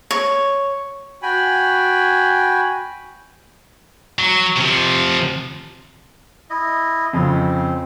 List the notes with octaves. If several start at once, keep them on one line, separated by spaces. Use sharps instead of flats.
C#5
F#4 G5 G#5 B5
F#3
C3 F3
E4 D#5
F2 C#3 C4